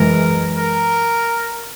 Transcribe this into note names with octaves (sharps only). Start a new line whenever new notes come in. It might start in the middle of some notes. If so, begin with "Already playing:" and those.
Already playing: F#2 E3 G#3 A#4
A#4